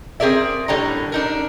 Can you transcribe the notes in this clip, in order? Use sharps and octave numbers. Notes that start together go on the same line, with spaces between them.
C4 G#4 A#4 D5 E5
A2 D3 G3 C#5 A#5
D4 D#4 A#4